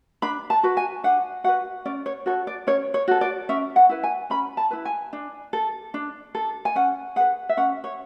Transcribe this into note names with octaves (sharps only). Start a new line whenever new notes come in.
D4 B5
A5
F#4 B4
G#5
D4 F#5
F#4 B4 F#5
C#4 D5
C#5
F#4 A4 C#5
D5
C#4 C#5
C#5
F#4 A4
D5
C#4 E5
F#5
E4 B4
G#5
C#4 B5
A5
E4 B4
G#5
D4
A4
D4
A4
G#5
C#4 F#5
G#4 B4 F#5
E5
C#4 F#5
C#5